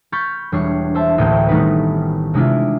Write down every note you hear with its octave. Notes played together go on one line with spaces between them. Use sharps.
B5 C#6 F6 G6 A6
E1 G3 D4 C#5 C#6 C7
C5 E5 A5
A1 D2 A2 A#3 G5
D#3 G3 A3 B3 D#4 B4
C3 G#3 D4 E4 F4